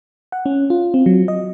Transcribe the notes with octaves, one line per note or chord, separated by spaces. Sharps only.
F#5
C#4
F4
C4
F#3
D#5